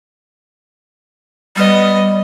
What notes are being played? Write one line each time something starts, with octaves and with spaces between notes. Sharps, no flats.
G3 B3 D#5